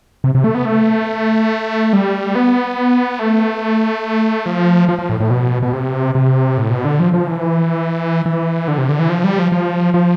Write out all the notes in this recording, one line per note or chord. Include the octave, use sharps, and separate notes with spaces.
C3
C3
A3
B3
A3
G3
B3
A3
F3
F3
F3
A2
A2
B2
B2
C3
C3
A2
B2
D3
F3
F3
E3
E3
D3
C3
D3
E3
F3
G3
F3
F3
F3